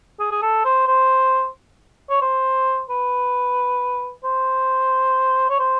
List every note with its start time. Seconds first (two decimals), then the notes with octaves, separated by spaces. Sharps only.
0.20 G#4
0.31 G#4
0.42 A4
0.64 C5
0.87 C5
2.10 C#5
2.22 C5
2.89 B4
4.24 C5
5.49 C#5
5.59 C5